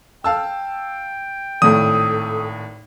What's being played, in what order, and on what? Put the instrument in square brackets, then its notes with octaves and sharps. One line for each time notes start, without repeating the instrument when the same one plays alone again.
[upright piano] F5 A5 E6 [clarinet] G5
[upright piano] G#1 A2 [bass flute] A4 [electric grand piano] D#6